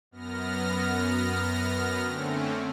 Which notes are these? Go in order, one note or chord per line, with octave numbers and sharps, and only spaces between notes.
F#2 B3 F6 A#6
D3 A3 C4 C#4